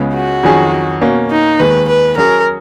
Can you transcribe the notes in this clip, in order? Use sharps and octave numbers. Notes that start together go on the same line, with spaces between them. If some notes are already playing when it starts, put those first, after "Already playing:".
Already playing: C#2 C#3 G#3 B3
F#4
F2 D#3 F#3 C#4 G#4
B2 A#3 C#4
D#4
D#2 D#3 G#3 B4
B4
F#3 C#4 G#4 A#4 C#5